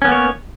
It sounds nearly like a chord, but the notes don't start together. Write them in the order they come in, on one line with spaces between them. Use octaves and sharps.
C#4 B3 A#3 C#5